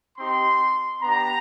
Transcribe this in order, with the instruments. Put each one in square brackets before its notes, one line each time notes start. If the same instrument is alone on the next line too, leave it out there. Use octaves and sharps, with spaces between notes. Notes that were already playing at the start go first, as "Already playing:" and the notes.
[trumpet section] C4 D#4 G4 C6
B3 D4 G4 A#5